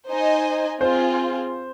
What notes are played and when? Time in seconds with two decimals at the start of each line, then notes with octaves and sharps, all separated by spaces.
0.09 D#4 C5 D#5 G#5
0.80 C4 F4 G#4 C5